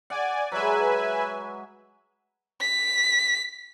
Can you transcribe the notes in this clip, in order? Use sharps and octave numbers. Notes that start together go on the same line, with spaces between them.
D5 F#5 G#5
F#3 G#3 B4 E5 G#5
B6